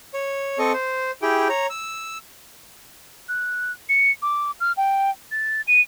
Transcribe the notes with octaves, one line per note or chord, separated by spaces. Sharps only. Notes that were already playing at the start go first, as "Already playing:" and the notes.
C#5
C4 A4 D#5 C#6
C5
E4 G4 G#4 G5
C#5 A#5
E6
F#6
C#7
D6
F6
G5
A6
D#7